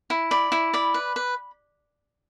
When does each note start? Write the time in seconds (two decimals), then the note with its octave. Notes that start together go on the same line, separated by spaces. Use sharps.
0.10 E4
0.31 D5 B5
0.52 E4
0.73 D5 B5
0.94 B4
1.16 B4